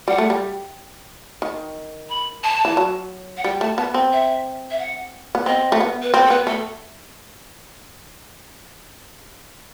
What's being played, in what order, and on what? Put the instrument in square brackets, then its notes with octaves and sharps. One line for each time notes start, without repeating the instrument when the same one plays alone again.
[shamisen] G3 [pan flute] F#5
[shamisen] A3
G3
D#3
[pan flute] B5
A5
[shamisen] E3
F#3
[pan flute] F#5
[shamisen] G3 [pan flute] G5
[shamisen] A3 [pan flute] A5
[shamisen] B3 [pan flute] A5
[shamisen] C4
[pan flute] E5
E5
F#5
[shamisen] B3
[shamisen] C4 [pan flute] D#5
[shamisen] A3
B3
[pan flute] B4
[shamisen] C4 [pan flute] C5
[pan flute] A4
[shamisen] B3 [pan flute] B4
[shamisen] A3 [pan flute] A4